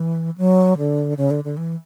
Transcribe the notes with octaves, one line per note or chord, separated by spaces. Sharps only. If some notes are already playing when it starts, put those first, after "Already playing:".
Already playing: E3
F#3
D3
C#3
D3
D3
E3